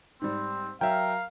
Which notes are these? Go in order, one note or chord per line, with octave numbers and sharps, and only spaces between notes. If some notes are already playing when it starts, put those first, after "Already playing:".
G#2 G3 C4
F#3 A#4 E5 F5 G5